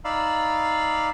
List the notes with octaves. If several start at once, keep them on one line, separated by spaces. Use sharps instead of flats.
D#4 D5 F5 B5 E6